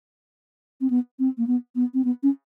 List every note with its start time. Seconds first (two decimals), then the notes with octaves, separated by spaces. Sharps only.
0.81 C4
0.90 B3
1.19 C4
1.38 A#3
1.47 B3
1.76 B3
1.94 C4
2.05 B3
2.23 C#4